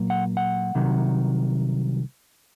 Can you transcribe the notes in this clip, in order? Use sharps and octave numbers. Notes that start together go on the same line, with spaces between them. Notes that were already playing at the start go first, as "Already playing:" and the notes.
Already playing: A#2 F#3 A#3
F#5
F#5
C2 C3 D#3 F#3